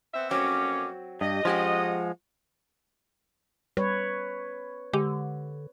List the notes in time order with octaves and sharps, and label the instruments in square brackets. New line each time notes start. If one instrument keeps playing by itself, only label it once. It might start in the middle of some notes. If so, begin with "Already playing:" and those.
[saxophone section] B3 C4 E5
[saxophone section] F2 A#3 C#4 [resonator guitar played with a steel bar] F#3 C4 F#4 [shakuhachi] D6
[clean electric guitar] G2 [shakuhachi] G4 [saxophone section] D#5
[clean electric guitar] F3 G#3 [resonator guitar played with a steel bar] C#4 G4 G#4 [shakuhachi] F#5
[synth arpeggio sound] G3 [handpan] B4 C#5
[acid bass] D3 [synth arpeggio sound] G#3 G4 D6